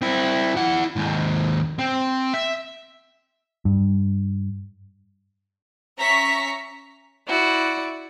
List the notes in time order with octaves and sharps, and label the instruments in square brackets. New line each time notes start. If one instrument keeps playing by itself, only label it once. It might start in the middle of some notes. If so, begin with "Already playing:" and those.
[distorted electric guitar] C4 E4
E4 F#5
D#2 G#2
C4
E5
[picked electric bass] G2
[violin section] C#4 E5 A#5 C#6 B6
[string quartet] E4 F#4 D5